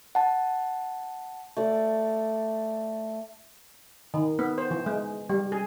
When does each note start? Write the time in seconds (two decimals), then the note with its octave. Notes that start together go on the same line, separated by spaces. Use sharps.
0.15 F#5 A5
1.57 A3 D5
4.14 D#3
4.39 B3
4.58 C5
4.71 E3
4.86 G#3
5.29 G3
5.52 G#4